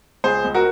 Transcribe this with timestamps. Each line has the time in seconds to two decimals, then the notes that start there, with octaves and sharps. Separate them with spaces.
0.24 C#2 G#4 C5
0.44 C#2
0.55 F#4 A#4